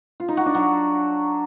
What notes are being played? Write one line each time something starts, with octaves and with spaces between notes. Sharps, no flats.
F4
D#4
F#4
D4
F#3